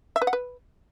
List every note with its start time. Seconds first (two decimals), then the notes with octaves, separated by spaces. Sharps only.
0.16 E5
0.22 B4
0.27 F#5
0.33 B4